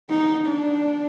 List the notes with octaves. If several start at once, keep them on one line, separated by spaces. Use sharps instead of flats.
D#4
D4